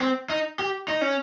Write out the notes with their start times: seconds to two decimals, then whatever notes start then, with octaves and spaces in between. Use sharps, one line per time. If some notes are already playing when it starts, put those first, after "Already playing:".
0.01 C4
0.30 D#4
0.59 G4
0.88 D#4
1.01 C#4